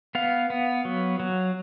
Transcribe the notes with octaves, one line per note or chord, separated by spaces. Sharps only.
B3 F5
B3
F#3
F#3